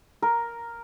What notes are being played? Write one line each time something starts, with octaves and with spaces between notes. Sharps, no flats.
A#4